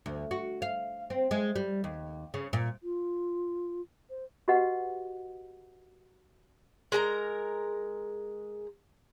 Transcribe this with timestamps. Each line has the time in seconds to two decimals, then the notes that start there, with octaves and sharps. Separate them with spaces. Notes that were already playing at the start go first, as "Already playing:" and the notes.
0.06 D2
0.31 F#4
0.62 F5
1.10 C4
1.31 G#3
1.56 G3
1.84 D#2
2.34 C#3
2.53 A#2
2.83 F4
4.10 C5
4.48 F#4 G4 B4 D#5 F#5
6.92 G#3 A#4 G#5 A#5